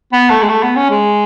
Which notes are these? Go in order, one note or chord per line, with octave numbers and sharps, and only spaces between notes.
B3
A3
G#3
A3
B3
C#4
G#3